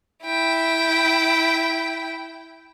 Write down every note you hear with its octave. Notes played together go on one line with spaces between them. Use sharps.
E4 G5